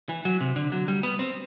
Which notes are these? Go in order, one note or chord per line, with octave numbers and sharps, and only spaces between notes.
E3
F#3
C3
D3
F#3
G3
B3
C4